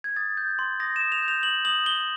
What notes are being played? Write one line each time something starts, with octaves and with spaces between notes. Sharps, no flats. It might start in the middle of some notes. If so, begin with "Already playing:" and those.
G#6
D#6 A6
G6
C6
D#6 A#6
D#6 E7
F7
G6
F7
D#6 F#7
D#6 F#7
D#6 G7